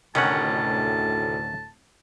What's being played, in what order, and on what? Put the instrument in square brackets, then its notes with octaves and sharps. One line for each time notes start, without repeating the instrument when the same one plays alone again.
[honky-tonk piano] F1 [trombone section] D2 A2 [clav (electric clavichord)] D#3 C#4 F#5 [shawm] A5